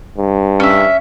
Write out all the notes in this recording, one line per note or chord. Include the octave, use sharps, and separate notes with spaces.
G2
C#4 E5